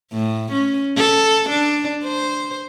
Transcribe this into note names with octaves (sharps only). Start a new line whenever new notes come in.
A2
C#4
A4
D4
C5